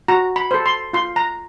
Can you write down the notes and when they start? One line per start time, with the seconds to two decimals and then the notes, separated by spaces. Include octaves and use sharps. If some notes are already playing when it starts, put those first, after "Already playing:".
0.08 F#4 A#5
0.36 B5
0.51 A4 C5
0.66 C6
0.93 F4 C6
1.16 A#5